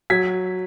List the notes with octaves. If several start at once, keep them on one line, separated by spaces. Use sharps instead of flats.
F#3 G#6 B6